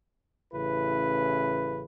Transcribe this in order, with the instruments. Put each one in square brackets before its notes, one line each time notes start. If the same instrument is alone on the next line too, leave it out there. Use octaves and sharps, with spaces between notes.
[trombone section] A1 C#3 E4 B4